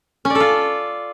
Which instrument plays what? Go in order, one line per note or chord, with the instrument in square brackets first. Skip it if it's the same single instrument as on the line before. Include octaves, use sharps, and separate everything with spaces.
[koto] C#4
D5
A4
F4